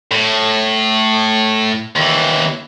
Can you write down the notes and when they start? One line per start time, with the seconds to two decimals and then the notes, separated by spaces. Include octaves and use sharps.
0.11 A2
1.96 D#2 E3